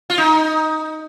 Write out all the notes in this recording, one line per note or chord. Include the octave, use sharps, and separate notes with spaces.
F4
D#4